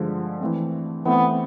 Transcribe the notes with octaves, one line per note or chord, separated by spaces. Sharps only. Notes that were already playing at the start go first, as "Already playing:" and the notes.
Already playing: G2 D3 F3 G#3
E3 A3 C4
E3 A3 B3 C4